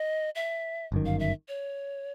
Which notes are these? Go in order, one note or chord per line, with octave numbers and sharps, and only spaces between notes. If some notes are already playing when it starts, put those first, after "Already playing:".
Already playing: D#5
E5
G1 F#2 D#3
F5
E5
C#5